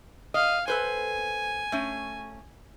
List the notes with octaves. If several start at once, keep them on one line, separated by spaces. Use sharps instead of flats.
D#5 F5
A4 B4 C5 G#5
A3 C#4